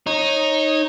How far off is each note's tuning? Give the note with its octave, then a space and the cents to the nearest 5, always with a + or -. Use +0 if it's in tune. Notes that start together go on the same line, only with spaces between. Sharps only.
D#4 +0 C#5 -20